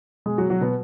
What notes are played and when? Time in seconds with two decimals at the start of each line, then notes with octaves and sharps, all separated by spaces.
0.26 B2 G#3 G#4
0.38 F#3 F#4
0.50 F#3 F#4
0.61 B2 B3